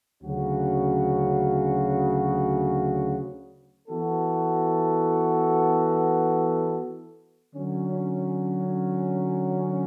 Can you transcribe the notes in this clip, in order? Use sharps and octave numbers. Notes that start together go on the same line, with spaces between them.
D2 C#3 F#3 C#4 F#4
E3 B3 F#4 A4
D3 F#3 C#4